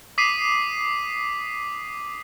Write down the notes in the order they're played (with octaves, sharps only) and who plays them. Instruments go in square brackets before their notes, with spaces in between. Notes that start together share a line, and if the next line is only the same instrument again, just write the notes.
[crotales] D6 D#6 B6 C7 D#7